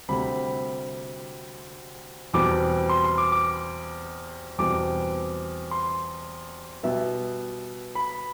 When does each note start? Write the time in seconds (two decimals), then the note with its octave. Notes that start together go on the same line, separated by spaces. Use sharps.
0.09 D2 C3 G3 C4 B5
2.33 E2 B2 G3 C4 D6
2.89 C6
3.04 C6
3.18 D6
3.32 D6
4.58 E2 B2 G3 C4 D6
5.71 C6
6.83 B2 G3 B3 E5
7.95 B5